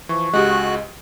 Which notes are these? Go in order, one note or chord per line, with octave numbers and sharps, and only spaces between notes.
E3 F3 C#6
C#2 G#3 F#4 G4 D#5 F#6